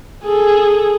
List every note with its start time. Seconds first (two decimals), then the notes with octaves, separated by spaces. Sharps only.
0.24 G#4 A4